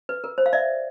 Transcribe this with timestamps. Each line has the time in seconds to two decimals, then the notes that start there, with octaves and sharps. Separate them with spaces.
0.09 B4
0.24 A#4
0.38 C5
0.46 F5
0.53 D5 E5